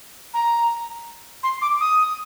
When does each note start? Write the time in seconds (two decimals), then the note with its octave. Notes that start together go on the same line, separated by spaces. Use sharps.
0.34 A#5
1.43 C6
1.62 D6
1.81 D#6